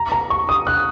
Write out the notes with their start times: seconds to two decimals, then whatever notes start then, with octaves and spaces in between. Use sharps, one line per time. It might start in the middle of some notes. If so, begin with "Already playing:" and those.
Already playing: A#5
0.12 A#5
0.30 C#6
0.49 D#6
0.67 F#6